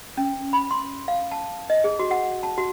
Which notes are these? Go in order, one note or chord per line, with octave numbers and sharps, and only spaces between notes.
C#4
B5
C6
F5
A5
D#5
G#4
F#4
F#5
A5
F#4